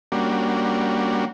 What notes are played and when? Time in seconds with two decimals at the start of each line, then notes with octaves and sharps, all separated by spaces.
0.12 G3 A#3 C#4 D4 F#4